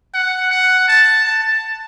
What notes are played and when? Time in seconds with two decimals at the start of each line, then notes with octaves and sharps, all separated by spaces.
0.14 F#5
0.51 F#5
0.88 A5
1.25 A5